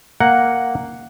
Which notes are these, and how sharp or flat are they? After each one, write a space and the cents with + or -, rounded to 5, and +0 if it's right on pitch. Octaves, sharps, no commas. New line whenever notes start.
A#3 +0 F#5 +0 A#5 +0